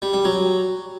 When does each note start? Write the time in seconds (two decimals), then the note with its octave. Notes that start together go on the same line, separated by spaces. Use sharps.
0.02 G3
0.13 G3
0.25 F#3